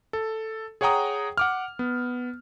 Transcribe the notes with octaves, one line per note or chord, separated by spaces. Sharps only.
A4
G#4 C#5 F#5 G5 A#5 D#6
F#5 D6 F6
B3